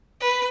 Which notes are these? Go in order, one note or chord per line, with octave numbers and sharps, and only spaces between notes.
B4